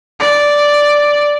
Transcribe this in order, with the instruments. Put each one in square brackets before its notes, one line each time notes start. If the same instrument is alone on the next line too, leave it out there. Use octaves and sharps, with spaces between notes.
[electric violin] D5